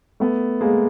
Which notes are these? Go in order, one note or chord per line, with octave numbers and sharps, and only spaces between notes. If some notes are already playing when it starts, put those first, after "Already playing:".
A3 B3
G#3 A#3